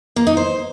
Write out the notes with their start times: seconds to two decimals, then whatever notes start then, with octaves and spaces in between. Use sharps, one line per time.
0.16 A#3
0.27 D#4
0.37 C5